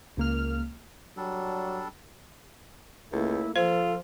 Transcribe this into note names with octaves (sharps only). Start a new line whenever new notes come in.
C#2 A#3 F6
F#3 G3 D4 A4
C#2 A3 A#3 E4
F3 F4 A4 C5